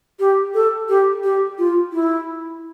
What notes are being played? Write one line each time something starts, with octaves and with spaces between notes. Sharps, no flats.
G4
A4
G4
G4
F4
E4